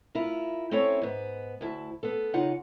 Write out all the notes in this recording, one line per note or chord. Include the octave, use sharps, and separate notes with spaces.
E4 F4 A#4
C4 C#4 E4 A4 C#5
G#2 B3
D2 E4 A5
B3 A4
C#3 D#4 F4 F#5